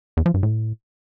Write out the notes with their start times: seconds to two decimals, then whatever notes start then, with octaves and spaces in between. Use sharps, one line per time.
0.17 E2
0.26 F3
0.34 G2
0.43 A2